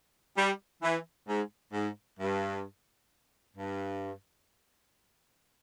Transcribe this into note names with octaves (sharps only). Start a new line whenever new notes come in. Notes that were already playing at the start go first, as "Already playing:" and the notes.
G3
E3
G#2
G#2
G2
G2